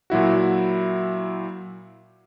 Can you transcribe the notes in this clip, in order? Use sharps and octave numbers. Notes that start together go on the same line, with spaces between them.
A#2 F#3 E4 F#4